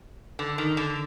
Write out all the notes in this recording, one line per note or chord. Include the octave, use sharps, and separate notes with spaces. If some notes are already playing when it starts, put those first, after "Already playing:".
D3
D#3
D3